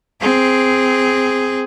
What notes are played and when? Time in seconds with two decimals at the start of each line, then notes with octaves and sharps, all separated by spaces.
0.21 C4 G#4